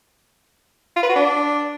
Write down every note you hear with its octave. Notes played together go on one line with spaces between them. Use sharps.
F4
B4
F#4
D4